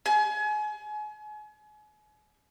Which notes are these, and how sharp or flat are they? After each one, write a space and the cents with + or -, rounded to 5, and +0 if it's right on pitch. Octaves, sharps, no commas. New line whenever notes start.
G#5 +35